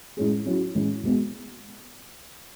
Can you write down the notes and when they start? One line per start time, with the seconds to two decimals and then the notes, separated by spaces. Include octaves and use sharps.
0.17 A2 G#3 C#4 G#4
0.46 F#3 C#4 E4
0.75 A2 E3 G#3 C#4
1.04 B2 G#3 B3